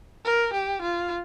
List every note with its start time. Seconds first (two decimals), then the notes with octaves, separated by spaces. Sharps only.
0.25 A#4
0.53 G4
0.82 F4